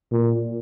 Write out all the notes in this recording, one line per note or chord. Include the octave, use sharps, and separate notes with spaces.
A#2